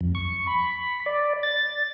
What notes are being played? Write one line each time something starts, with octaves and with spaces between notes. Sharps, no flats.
F2
C#6
B5
D5
A6